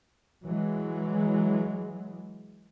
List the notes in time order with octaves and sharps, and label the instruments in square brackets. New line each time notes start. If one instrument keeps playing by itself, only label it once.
[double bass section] E3 F#3 G#3